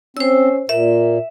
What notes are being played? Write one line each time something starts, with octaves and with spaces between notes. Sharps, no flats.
C4 C#4 C5 E6
A#2 A#4 E5